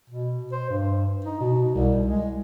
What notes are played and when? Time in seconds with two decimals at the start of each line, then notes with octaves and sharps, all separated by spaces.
0.10 B2
0.52 C5
0.70 G2
1.25 D#4
1.40 B2
1.75 C2
2.06 G#3